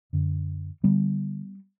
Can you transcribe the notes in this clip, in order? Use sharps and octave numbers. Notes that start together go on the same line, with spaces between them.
F#2 D3
D3 G3 B3